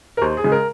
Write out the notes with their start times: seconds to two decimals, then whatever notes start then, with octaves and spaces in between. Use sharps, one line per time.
0.17 A#4
0.21 D#2 C5
0.37 G#4
0.44 C#3 G#3
0.52 A#4